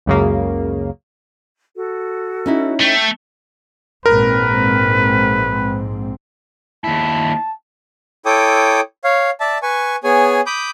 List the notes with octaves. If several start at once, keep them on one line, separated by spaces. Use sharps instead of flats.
C#2 F#2 C#3 A#3
F#4 A4
C#4 D#4 E4
A3 G5 G6
A#1 G#2 C4 A#4 B4
D#2 E4 A5
E4 A4 C#5 G5 D6 D#6
C#5 F5
D5 E5 A5
B4 G#5 C#6
B3 G#4 C#5 G#5
B5 D6 D#6 G6